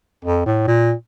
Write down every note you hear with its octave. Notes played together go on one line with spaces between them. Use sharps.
F2
A2
A#2